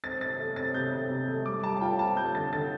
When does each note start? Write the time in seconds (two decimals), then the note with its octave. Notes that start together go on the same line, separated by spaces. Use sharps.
0.04 C4 A6
0.21 C4 A6
0.39 A3
0.56 C4 A6
0.74 C3 G6
0.92 C3
1.10 C3
1.28 A3
1.46 G3 D6
1.64 G3 A5
1.77 A5
1.81 F4 G5
1.99 C4 A5
2.17 G3 G6
2.35 D3 A6
2.52 D3 A6